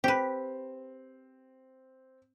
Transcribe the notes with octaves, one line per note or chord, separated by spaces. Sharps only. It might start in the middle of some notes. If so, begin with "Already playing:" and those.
C4 G4 B4